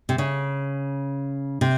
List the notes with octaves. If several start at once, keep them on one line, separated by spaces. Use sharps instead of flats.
C3
C#3
C3